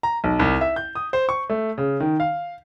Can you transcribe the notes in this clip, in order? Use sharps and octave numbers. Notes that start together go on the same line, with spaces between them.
A#5
B1
C2
E5
G6
D#6
C5
C#6
A3
C#3
D#3
F5